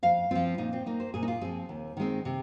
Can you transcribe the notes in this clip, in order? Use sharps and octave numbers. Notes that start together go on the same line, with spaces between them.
F2 F5
F3 C4 F4
A#2 D#4
C4
A#3 D#4
C5
A#2 G#4
D#4
F4
F3 C4 G#4
D#2
D#3 G#3 C4
C3